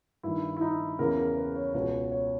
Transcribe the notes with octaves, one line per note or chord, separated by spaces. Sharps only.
G2 D#3 E4
E4
D#4
E2 C#3 E3 A#4
A#4
B4
C#5
C#2 B2 C#5
C#5